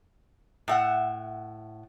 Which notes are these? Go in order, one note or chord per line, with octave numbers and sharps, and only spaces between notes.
A2 E5 F#5